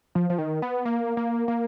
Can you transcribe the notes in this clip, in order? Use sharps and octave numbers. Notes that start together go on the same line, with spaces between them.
F3
F3
D#3
B3
A#3
A#3
A#3